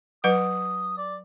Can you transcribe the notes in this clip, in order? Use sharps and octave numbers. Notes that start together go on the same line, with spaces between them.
F#3 B4 F#5 D#6
D5